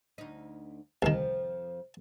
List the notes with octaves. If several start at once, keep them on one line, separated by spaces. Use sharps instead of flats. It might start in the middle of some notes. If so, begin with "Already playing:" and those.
D2 D#4
C2 F2 D#3 F3